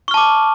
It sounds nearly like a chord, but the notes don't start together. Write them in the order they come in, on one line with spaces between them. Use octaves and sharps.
C#6 F6 A5 D6